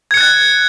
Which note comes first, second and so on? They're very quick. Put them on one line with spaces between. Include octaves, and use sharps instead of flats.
G#6 C#7 F#6 A6